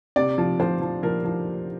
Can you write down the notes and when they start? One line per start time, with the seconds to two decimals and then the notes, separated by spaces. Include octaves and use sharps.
0.16 C3 D5
0.38 F3
0.60 F3 C5
0.81 F3
1.03 F3 A#4
1.25 F3